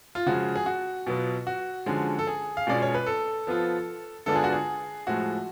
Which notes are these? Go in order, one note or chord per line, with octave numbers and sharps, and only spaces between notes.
F4
C#3 F3 G#3 F#4
G#4
F#4
B2 F#3 B3 F4
F#4
D3 F3 G#3 C#4
A4
G#4
F5
B2 G#3 C#4 F4 D5
C#5
B4
A4
F3 B3 F4
D3 G#3 B3 D4 F4 A4
G#4
F#4
G#4
A2 F3 G#3 F#4